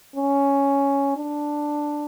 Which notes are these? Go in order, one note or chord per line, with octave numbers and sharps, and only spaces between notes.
C#4
D4